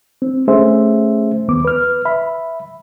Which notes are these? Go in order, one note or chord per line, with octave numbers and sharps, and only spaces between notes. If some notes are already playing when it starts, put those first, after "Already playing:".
C4
A3 C#4 G#4 C5 E5
D#2 B3 D6
B4 F6
E5 B5